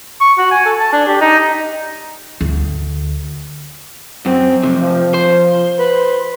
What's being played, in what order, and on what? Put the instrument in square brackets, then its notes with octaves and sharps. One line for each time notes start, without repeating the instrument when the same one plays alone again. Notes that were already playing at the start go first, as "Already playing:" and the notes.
[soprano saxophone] C#6
F#4
G#5
A4
A5
D4
G4
D#4
[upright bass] D2
[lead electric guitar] F#2 [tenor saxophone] C4
[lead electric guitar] F2 C3
[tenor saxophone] F3
[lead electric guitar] C5
[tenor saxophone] B4